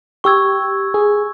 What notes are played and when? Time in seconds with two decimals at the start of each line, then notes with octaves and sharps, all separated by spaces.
0.24 G4 C#6 E6 G#6
0.94 G#4